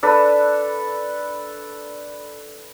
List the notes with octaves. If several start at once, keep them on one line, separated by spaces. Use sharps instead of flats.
D4 A4 B4